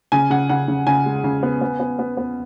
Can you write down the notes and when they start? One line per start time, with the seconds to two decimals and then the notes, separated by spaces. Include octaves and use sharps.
0.12 C#3 G#5
0.30 C#3 F#5
0.49 C#3 F#5
0.68 C#3
0.87 C#3 G#5
1.06 G#3
1.24 C#3
1.43 B3
1.62 B3
1.80 B3
1.99 B3
2.17 B3